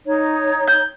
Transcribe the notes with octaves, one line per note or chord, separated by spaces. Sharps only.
D#4 C#5
G6